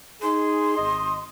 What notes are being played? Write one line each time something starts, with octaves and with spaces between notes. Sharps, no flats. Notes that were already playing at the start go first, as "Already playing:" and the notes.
D#4 G#4 C6
G#1 D#5